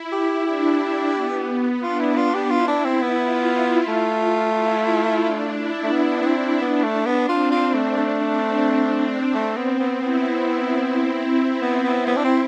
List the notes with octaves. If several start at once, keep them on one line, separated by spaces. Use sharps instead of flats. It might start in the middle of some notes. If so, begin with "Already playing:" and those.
Already playing: E4
G4
D4 G4
B3
D4 F4
E4
F4
G4
E4 F4
D4
C4
B3
F4
E4
A3 F4
E4
D4
E4
A3
B3 E4
B3
C4
B3 D4
A3
B3
C4 F4
F4
A3
A3 D4
C4
C4
C4
A3
B3
B3
B3 E4
B3
B3
B3
D4
C4